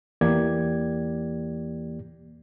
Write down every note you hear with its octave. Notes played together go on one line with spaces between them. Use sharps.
E2 E3 A#3 G4 D5 G#6